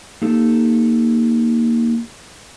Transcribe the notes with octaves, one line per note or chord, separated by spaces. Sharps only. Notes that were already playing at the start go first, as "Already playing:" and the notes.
A#3 D#4 G4 A4